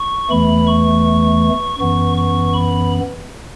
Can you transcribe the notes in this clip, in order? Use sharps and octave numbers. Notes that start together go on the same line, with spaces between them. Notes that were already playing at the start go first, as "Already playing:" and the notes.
Already playing: C#6
E2 E3 A3 B5
C#6
F#2 E3 B3 C#6
C#6
B5